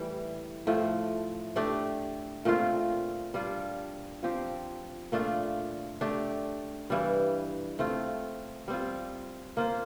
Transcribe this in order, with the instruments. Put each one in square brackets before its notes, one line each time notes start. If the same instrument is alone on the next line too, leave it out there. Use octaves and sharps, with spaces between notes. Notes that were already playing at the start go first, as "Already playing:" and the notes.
Already playing: [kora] A2 E3 G3
A2 F3 A3
A3 D4 G4 D5
A#2 A3 C4 F4
G3 D4 F4
F3 C4 G4
A#2 A3 D4 F4
A3 D4 G4
G2 E3 G3
A3 C4 F4
G3 C4 F4
A#3 F4 C5